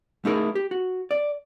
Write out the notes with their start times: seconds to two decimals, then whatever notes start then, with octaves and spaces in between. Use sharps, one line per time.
0.25 A3 D#4 E4 G#4 A#4
0.55 G4
0.71 F#4
1.11 D5